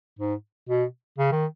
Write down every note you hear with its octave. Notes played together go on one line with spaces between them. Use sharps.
G#2
B2
C#3
D#3